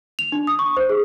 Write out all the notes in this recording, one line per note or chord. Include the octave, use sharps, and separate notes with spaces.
F7
D4
D#6
C#6
C5
G#4